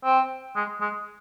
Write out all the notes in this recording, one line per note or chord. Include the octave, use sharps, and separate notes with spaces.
C4
G#3
G#3